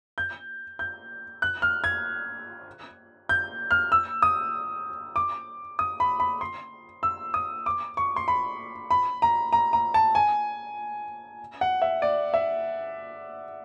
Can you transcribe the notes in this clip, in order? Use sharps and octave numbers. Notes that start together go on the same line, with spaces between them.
G6
G6
F#6
F6
G#6
G6
F6
E6
D#6
D6
D#6
B5
B5
C6
E6
D#6
D6
C#6
C6
B5
B5
A#5
A#5
A#5
A5
G#5
F#5
E5
D5
E5